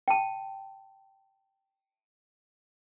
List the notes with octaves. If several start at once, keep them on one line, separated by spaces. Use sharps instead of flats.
G5 A5